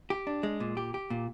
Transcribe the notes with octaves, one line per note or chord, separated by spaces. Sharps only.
G4
D4
G#3
A#2
G4
G4
A#2